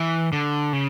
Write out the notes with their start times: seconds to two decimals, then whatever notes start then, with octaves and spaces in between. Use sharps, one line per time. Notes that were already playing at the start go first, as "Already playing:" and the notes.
Already playing: E3
0.33 D3
0.73 C#3